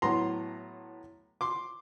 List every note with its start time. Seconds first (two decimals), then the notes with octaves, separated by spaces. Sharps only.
0.02 A2 F#3 B3 A#5 C6
1.41 C6 D6